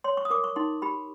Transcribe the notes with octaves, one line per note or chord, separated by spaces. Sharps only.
C#5 C6
C#6
D#6
A#4 D6
C#6
D#4 C6
G4 B5